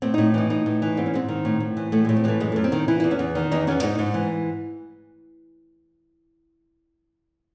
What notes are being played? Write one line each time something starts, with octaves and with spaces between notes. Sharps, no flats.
A2 C4
A2 D#4
E3 D#4
A2 D#4
A2
E3
G#2 C4
C#4
G#2 C4
D#3
A2
A2
E3
A2 A3
A2 G#3
C4
E3 G#3 A3
F#2 G#3
F#2 A3
C4
D#3
E3 E4
E2 E4
C#4
E2
D#3
E2 D#4
E2 C#4
G#2 D#4
G#2 D#4
E3